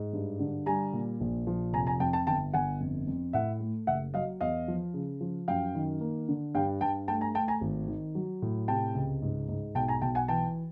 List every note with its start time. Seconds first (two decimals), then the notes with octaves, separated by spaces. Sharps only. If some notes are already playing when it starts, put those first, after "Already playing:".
Already playing: G#2
0.13 G2
0.40 D3
0.66 G3 G#5 A#5
0.93 A#2
1.21 A#1
1.47 F3
1.73 F1 G#5 A#5
1.86 G#5 A#5
2.00 F2 G5 A5
2.13 G5 A5
2.27 G1 G5 A5
2.54 G1 F#5 G#5
2.80 F2
3.07 F2
3.33 A2 E5 F#5
3.60 A3
3.87 F#1 E5 F#5
4.14 F#3 D#5 F5
4.41 E2 D#5 F5
4.68 F3
4.94 C#3
5.21 F3
5.48 F#2 F5 G5
5.75 D#3
6.01 A#3
6.28 D3
6.55 G2 F5 G5
6.81 G2 G5 A5
7.08 A3 G5 A5
7.21 G#5 A#5
7.35 A3 G5 A5
7.48 G#5 A#5
7.61 G#1
7.88 D#3
8.15 F#3
8.42 A2
8.68 C3 G5 A5
8.95 C#2
9.22 G#2
9.49 G#2
9.75 B1 G5 A5
9.88 G#5 A#5
10.02 B1 G5 A5
10.15 F#5 G#5
10.28 E3 G5 A5